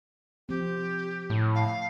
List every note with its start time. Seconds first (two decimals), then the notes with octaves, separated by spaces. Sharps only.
0.49 F3 C4 G4
1.30 A2
1.55 F5